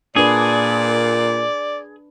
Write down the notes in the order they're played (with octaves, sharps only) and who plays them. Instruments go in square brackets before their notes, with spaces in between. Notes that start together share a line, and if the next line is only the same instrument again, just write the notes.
[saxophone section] A#2 [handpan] D4 B4 [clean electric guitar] G#4 [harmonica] D5